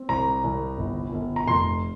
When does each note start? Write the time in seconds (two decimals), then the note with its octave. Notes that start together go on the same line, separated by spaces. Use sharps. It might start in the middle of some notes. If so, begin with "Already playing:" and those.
Already playing: C4
0.09 C2 A#5
0.44 C2
0.77 G1
1.12 G1
1.36 A#5
1.47 F1 C6